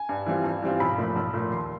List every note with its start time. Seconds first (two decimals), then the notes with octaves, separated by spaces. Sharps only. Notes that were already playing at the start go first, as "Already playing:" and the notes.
Already playing: G#5
0.09 G2
0.26 E3 G3 C4 F4
0.44 G2
0.62 E3 G3 C4 F4
0.80 B1 B5
0.98 A#2 F3 A3
1.16 B1
1.33 A#2 F3 A3
1.52 D#2 C6